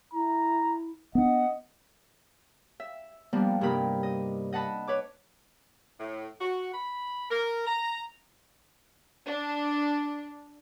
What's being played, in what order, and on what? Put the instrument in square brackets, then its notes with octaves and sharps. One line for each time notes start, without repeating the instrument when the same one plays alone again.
[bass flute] E4 [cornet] A#5
[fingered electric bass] B3 D4 [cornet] D#5 [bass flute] F#5
[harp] E5
F3 G3 A#3 B3 D4
G2 C3 A#3 D#4 A#4 B5
D#5
D#5 F#5 A5 B5
B4 C#5 D6
[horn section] A2
F#4
B5
A#4
A#5
[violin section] D4